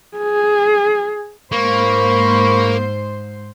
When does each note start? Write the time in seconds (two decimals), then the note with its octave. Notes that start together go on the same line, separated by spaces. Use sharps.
0.17 G#4
1.52 G#2 A#3 C5 B5 C#6